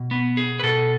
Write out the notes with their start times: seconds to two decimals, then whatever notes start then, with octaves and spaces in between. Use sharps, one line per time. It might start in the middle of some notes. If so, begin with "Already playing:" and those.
Already playing: B2
0.11 B3
0.37 G#4
0.60 B4
0.63 B2 A4